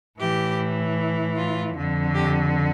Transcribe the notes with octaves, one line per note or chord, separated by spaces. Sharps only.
A2 E3 G4
F4
F2 D3
G4